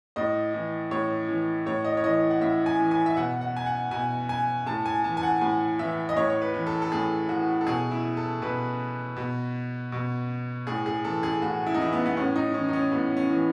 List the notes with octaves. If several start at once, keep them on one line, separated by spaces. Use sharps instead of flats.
A2 D#5
E3
A2 C#5
E3
A2 C#5
D#5
C#5
E3 D#5
F#5
A2 E5
G#5
E3
G#5
E5
B2 F#5
F#5
G#5
F#5
B2 G#5
G#5
A2 A5
G#5
E3 A5
G#5
F#5
A2 G#5
E3 E5
D#5
A2 C#5
C#5
B4
E3
A4
A4
A2 G#4
E3 F#4
A4
B2 G#4
E4
A4
B2 B4
B2
B2
A2 G#4
G#4
E3 A4
G#4
A2 F#4
E4
D#4
E3 E4
B3
B3
A2 C#4
D#4
E3 C#4
D#4
C#4
A2 B3
C#4
E3